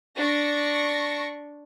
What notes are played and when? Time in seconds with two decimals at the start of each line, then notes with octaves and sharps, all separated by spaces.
0.17 D4 C#6 A#6